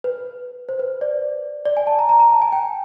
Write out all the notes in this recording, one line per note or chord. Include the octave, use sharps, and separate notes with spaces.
B4
C5
B4
D5
D5
G#5
A5
A#5
A#5
A#5
A5
G#5
G5